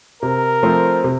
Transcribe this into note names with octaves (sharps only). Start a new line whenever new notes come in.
C3 A#4
F3 A3 C4
C3